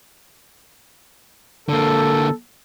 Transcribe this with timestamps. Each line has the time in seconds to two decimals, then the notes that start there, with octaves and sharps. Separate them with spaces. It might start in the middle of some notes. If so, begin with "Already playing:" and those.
1.69 D3 A#3 A4